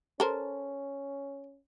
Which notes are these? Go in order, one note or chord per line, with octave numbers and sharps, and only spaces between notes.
C#4 A4 A#4 C5